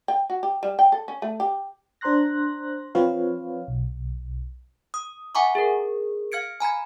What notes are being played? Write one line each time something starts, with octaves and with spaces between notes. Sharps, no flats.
G5
F#4
G4
G3
G5
A4
C#4
A3
G4
D4 C5 A#5 C6 F#6 A#6
F3 C4 F4 B4 C#5 F5
B1
D#6
E5 F#5 G#5 A#5 C#6 D6
G#4 A#4
F5 F6 G#6 C#7 D7
G#5 A#5 B5 G#6